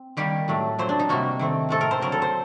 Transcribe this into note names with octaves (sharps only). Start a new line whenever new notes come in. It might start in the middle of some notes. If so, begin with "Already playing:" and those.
Already playing: C4
D#3 G3 A#3 G4
A2 F#3 A3
A#2 F#3 C4 C5
D4
D#4
C3 G3 A#3 F#4
D#3 A3 C4
A2 A3 C4 A4
A#4
C5
D3 F#3 A#3 A#4
A4
C5